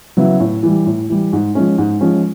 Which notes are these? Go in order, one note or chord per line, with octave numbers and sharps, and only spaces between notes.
C#3 F#3 B3 E4
A2
E3 G3
A2
E3 G3
G#2
F3 G#3 C#4
G#2
F3 G#3 C#4